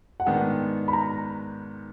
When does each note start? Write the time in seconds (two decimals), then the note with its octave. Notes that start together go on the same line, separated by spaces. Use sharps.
0.20 F#5
0.26 G#2 D#3 G#3 B3 D4 G5
0.88 B5
0.93 A#5